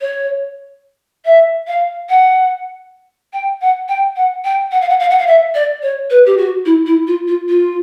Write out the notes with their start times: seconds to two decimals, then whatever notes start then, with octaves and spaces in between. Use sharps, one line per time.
0.01 C#5
1.25 E5
1.67 F5
2.09 F#5
3.33 G5
3.61 F#5
3.89 G5
4.16 F#5
4.44 G5
4.72 F#5
4.81 F5
4.89 F#5
5.00 F5
5.10 F#5
5.19 F5
5.27 E5
5.55 D5
5.83 C#5
6.10 B4
6.26 G4
6.37 F#4
6.66 E4
6.86 E4
7.07 F4
7.28 F4
7.49 F4